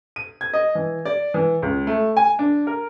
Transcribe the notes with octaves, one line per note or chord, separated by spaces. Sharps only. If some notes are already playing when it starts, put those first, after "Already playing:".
D#7
G#6
D#5
E3
D5
E3
C#2
A3
G#5
D4
A#4